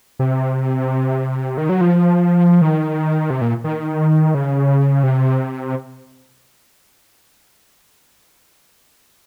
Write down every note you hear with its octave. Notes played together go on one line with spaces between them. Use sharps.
C3
D#3
F#3
F3
D#3
C3
A#2
D#3
C#3
C3